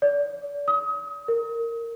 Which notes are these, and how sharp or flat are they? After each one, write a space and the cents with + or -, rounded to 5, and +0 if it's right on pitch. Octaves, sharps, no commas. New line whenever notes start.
D5 -40
D#6 +35
A#4 -10